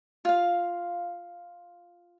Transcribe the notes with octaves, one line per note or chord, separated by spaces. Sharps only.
F4 F5